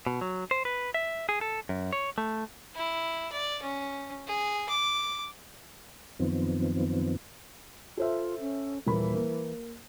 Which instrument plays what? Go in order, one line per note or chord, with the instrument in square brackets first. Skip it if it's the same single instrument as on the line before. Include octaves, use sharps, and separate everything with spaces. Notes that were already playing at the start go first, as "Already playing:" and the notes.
[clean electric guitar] B2
F#3
C5
B4
E5
G#4
A4
F#2
C#5
A3
[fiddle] E4
D5
C#4
G#4
D6
[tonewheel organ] F#2 D#3 F3 B3 C4
[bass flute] F4 [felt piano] A4 C5 E5
[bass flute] C#4
[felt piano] D#1 A#3 B5 [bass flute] E3
[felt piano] A#3